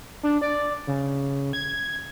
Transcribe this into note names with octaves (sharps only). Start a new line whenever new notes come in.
D4
D5
C#3
G#6